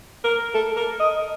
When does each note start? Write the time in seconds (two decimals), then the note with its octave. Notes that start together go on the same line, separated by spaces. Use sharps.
0.24 A#4
0.55 A4
0.76 A#4
1.00 D#5